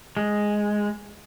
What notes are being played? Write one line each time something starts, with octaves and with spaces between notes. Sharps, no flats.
G#3